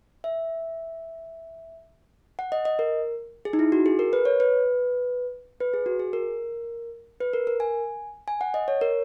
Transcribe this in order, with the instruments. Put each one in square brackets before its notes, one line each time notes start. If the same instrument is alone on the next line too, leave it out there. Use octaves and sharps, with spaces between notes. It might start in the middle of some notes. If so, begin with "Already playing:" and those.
[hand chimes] E5
F#5
D#5
D#5
A#4
G#4
D#4
E4
F#4
G#4
A#4
B4
C#5
B4
B4
G#4
F#4
G#4
A#4
B4
A#4
A#4
G#5
G#5
F#5
D#5
C#5
A#4